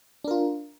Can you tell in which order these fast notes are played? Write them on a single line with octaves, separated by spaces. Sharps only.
D4 A#4 F4